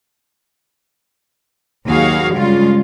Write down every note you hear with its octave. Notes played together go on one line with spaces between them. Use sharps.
D#2 F#3 F#4 G#4 F5
G2 C#3 G3 G#3 F4